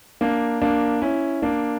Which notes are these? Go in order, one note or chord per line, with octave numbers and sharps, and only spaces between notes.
A#3 D4
A#3 D4
C#4 E4
A#3 D4